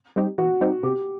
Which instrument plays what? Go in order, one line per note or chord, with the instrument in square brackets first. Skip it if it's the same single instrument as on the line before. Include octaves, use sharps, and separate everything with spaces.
[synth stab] G3 C4 D#4 G4
[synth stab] E3 [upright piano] F#4
[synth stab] G3 C4 D#4 G4
[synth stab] C3 [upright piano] G4